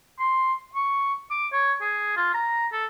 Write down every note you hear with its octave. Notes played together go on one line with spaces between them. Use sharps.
C6
C#6
D6
C#5
G#4
F4
A#5
A4